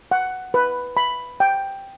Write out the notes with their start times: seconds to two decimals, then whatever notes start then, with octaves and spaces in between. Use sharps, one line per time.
0.11 F#5
0.54 B4
0.97 B5
1.40 G5